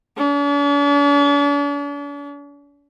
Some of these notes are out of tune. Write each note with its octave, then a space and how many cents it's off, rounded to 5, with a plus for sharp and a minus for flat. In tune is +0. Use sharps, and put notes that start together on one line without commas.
D4 -45